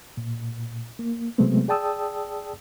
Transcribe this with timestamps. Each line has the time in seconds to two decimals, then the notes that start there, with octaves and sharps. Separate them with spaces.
0.17 A#2
0.99 A#3
1.38 C3 F#3 G#3 A3 B3 C4
1.68 G#4 D5 G5 A5 D#6 E6